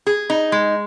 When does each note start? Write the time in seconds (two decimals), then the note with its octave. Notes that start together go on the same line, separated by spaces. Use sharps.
0.06 G#4
0.30 D#4
0.52 G#3